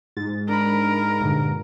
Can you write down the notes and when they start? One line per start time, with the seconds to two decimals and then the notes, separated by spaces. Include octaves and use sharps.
0.17 G#2 A6
0.49 D4 A#4 A#5 B5
1.21 G2 A#2 D3